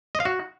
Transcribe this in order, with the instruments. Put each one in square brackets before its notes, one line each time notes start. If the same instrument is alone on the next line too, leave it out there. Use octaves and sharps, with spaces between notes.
[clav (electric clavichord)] D#5
F5
F#4